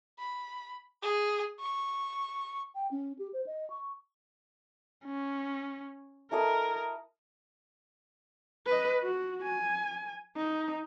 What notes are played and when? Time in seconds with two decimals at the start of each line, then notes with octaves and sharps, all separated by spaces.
0.18 B5
1.02 G#4
1.60 C#6
2.75 G5
2.91 C#4
3.19 G4
3.33 C5
3.46 D#5
3.70 C#6
5.05 C#4
6.31 E4 A4 A#4 D#5
8.66 B4 D#5
9.02 F#4
9.43 G#5
10.36 D#4